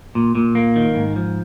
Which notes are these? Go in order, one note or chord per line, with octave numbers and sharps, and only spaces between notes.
A#2
A#2
A#3
D#3
G#2
F3